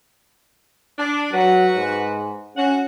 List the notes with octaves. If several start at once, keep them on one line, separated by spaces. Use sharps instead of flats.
D4
F#3 F#4 B4
G#2
C#4 F#4 F#5